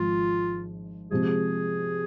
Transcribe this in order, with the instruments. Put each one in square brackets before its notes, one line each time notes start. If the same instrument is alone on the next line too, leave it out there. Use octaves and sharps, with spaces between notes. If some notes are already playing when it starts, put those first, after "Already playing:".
Already playing: [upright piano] G#1 G#2 F3 [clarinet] F4
[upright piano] C3 F3 G#3 [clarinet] G#4